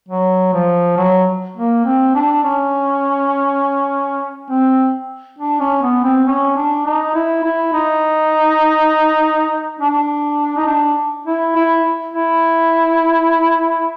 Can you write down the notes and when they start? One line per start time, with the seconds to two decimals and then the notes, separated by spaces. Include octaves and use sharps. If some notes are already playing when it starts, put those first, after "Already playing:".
0.09 F#3
0.53 F3
0.97 F#3
1.57 A#3
1.85 C4
2.15 D4
2.44 C#4
4.51 C4
5.39 D4
5.60 C#4
5.83 B3
6.04 C4
6.27 C#4
6.57 D4
6.86 D#4
7.15 E4
7.44 E4
7.74 D#4
9.80 D4
10.58 D#4
10.67 D4
11.26 E4
11.56 E4
12.14 E4